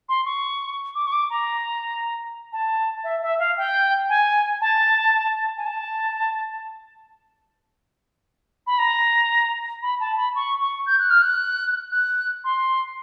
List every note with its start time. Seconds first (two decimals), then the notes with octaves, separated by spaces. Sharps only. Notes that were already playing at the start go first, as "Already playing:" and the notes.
0.09 C6
0.26 C#6
0.95 D6
1.07 C#6
1.12 D6
1.30 A#5
2.52 A5
3.04 E5
3.22 E5
3.39 F5
3.57 G5
4.09 G#5
4.61 A5
5.57 G#5
5.66 A5
8.67 B5
8.78 A#5
9.82 B5
10.00 A5
10.17 B5
10.35 C#6
10.60 C#6
10.86 G6
10.99 F#6
11.10 F6
11.22 F#6
11.92 F#6
12.44 C6